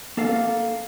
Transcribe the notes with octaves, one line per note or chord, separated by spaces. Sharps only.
A#3 A4 F5